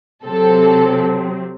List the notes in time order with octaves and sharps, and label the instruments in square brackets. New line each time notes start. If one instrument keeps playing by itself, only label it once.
[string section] C3 F#3 C4 A4